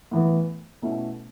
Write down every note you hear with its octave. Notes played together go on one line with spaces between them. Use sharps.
A2 E3 B3
B2 A3 C#4 E4